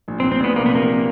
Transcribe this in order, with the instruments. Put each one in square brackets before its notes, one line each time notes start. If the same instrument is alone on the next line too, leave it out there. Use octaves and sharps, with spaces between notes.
[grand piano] A#1
[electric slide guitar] C4
[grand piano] A#1
[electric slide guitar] C4
[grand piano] A#1 [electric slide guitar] B3
[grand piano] C3 [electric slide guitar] A#3
[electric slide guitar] B3
[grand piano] C3 [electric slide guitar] A#3